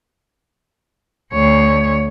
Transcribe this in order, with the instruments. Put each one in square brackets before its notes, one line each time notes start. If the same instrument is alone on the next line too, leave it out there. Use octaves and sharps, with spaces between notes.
[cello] D2 C#5